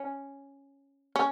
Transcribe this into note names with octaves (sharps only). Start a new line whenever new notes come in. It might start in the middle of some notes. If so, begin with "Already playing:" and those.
Already playing: C#4
C#4